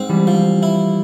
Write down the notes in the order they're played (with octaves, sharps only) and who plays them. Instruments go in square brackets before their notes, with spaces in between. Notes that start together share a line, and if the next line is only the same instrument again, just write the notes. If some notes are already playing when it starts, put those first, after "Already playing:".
Already playing: [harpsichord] G#2 C4
[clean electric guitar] E3 G3
[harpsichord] F3
E4